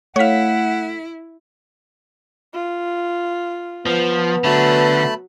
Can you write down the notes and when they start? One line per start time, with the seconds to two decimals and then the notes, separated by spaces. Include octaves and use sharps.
0.16 A3 E4 C#5 F5 F#5 B6
2.53 F4
3.86 F3 B3
4.44 D3 F#3 A3 A5 B5